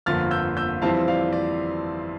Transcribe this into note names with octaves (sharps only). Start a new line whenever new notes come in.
G1 F2 D3 F3 A#3 F6 A6
E6 G6
E6 G6
F2 E3 G3 C4 E4 F5 A5
D5 F5
D5